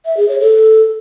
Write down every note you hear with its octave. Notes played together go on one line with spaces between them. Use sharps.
E5
G#4
C#5
A4